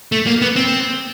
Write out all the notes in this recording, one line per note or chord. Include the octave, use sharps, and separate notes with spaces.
A3
A#3
B3
C4